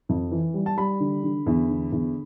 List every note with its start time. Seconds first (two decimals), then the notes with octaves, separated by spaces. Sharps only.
0.09 F2
0.31 E3
0.54 G3
0.66 A5
0.77 G3 B5
1.00 D3
1.24 D3
1.46 E2
1.69 D3
1.92 E2